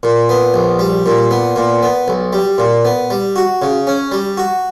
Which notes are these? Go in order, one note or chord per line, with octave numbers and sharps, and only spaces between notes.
A#2
B3
A#1
G3
A#2
B3
A#2
B3
B1
G3
A#2
B3
G3
F#4
C#3
C#4
G3
F#4